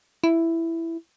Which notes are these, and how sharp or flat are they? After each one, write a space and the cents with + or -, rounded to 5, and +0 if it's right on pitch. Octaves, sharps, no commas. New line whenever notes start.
E4 +5